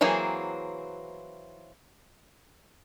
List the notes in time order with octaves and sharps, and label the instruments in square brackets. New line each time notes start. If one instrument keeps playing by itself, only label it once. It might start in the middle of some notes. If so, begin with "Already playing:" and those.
[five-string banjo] E3 F#3 A#3 C4 G#4